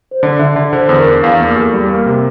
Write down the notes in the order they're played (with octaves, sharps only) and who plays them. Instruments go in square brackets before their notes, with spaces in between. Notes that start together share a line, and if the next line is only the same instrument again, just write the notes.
[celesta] C5
[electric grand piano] D3 [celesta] D5
[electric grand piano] D3 [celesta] E5
[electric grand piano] D3 [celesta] D5
[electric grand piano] D3 [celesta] C5
[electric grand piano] E2 [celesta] C5
[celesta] A#4
[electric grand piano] D4
[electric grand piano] E2 [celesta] F5
[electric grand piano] A#3
[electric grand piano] E2 [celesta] G4
[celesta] A4
[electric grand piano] G3 [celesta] G4
[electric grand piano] A#3
C3